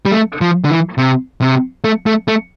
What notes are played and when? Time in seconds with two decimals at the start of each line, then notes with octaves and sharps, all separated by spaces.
0.06 G3
0.12 A3
0.41 F3
0.65 D3
0.70 E3
0.98 C3
1.41 C3
1.84 A3
2.06 A3
2.28 A3